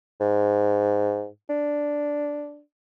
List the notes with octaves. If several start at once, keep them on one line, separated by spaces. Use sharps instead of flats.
G#2
D4